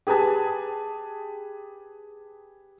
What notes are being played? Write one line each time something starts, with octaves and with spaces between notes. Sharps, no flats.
G4 G#4 B4 G#5 A5